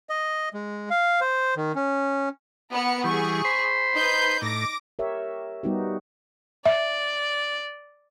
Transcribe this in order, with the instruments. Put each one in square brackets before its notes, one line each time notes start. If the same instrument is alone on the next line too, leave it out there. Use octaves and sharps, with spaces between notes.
[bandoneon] D#5
G#3
F5
C5
D#3
C#4
[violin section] B3 A#4 C#7
[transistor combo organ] E3 G3 [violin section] G#4 C#6
[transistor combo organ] C5 B5 C6
[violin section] D#4 B4 G6
[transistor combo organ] A2 [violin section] D6 A#6
[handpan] G4 A#4 C#5 E5
G3 B3 D#4 F#4 G4
[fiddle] D5 [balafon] E5